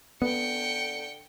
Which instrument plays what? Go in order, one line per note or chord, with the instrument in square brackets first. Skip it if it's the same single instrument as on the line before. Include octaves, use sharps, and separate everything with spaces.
[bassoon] D3 [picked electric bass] B3 [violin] G5 C#7